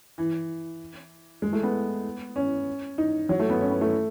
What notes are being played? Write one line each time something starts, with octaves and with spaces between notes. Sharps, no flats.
E3
G#3
A3
B3
C#4
D#4
F#3
A3
B3
C#4
B3
A3